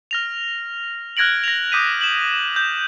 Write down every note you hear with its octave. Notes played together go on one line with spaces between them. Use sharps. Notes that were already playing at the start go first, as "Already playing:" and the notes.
F6 A#6 F7
F6 F#6 G#6 A#6 D7 F#7
A#6 F7
D6 D#6 G6 B6 D#7
E7 F#7
G6